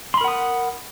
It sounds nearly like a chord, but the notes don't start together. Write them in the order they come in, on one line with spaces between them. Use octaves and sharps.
C6 B5 A#4 F#5 D#6